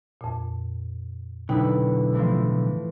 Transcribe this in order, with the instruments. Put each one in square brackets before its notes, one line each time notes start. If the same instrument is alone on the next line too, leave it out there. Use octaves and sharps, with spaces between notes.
[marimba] F2 A#2
[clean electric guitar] B1 D3 [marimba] D#4 G5 [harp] E4 B4
[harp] A2 E3 F3